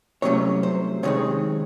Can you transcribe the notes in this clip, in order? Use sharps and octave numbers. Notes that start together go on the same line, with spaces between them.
C2 C3 F#3 A3 C#4 C#5
C5
C3 D#3 G#3 C4 D#4 C#5